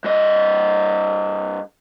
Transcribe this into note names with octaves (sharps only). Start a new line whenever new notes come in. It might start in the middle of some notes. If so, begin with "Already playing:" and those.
G2 D#5